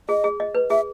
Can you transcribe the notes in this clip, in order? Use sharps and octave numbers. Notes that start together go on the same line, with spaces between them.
G#4 D#5
G#4
D#5
B4
G#4 E5